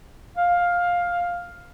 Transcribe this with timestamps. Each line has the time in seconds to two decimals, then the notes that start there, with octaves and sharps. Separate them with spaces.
0.37 F5